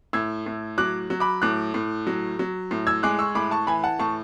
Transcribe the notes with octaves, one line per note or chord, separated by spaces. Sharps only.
A2 E6 G#6
A2
F#3 D6 F#6
F#3
B5 D6
A2 D6 F#6
A2
F#3
F#3
A2
E6 G#6
G#3 D6 F#6
C#6 E6
A2 B5 D6
A5 C#6
E3 G#5 B5
F#5 A5
A2 A5 C#6